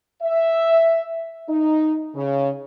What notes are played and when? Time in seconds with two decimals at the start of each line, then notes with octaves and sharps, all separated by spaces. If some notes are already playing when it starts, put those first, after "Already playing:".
0.23 E5
1.49 D#4
2.15 C#3